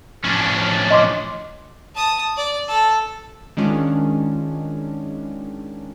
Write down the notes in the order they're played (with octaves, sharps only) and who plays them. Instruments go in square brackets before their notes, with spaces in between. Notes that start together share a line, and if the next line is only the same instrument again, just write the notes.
[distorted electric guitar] A2 F3 [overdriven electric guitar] C#4 D4
[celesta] D#5 C6 D6
[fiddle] A5 D#6
D5
A4
[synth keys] D#3 G#3 C#4 D4 F4